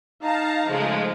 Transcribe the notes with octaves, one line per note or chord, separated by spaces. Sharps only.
D#4 F5 A5 A#5
C#3 F3 G#3 A3